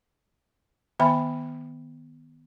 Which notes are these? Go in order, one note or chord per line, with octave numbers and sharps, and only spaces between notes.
D#3 B3 E5 G5 B5